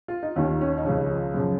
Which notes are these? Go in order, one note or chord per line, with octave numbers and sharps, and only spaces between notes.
F4
D#4
D#2 D#3 C#4
C#4
D#4
C#2 C#3 F3 C#4
F#2 C#3 F3